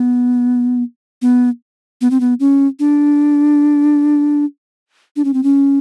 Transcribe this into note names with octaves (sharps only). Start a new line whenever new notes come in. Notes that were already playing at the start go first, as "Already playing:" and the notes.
Already playing: B3
B3
B3
C4
B3
C#4
D4
D4
C#4
C4
C#4